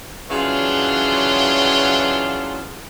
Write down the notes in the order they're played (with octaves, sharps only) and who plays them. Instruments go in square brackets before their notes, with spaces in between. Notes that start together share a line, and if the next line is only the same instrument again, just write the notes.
[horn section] C#3 E3 F#3 D4 F4